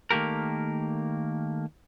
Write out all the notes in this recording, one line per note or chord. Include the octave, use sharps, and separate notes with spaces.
D#3 A3 A#3 G4 A#4